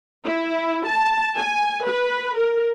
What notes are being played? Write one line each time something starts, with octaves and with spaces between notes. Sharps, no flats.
E4
A5
G#5
B4
A#4